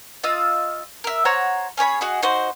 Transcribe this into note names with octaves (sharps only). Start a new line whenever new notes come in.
F4 D#5 F5 E6
A#4 E5
C5 C#5 F#5 A#5
C#4 G#4 C#5 B5
F#4 G#4 D#5 F#5
D#4 F#4 C5